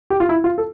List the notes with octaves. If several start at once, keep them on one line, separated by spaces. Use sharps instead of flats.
G4
F4
E4
F4
A4